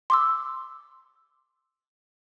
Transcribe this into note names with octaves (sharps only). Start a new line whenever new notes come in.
C6 D6 E6